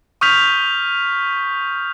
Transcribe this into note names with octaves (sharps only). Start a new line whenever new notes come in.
C#6 D#6 F6 G6 B6 F7